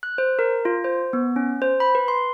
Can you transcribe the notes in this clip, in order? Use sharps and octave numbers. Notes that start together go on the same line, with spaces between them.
F#6
C5
A#4
F4
C5
B3
C#4
C5
B5
B4
C6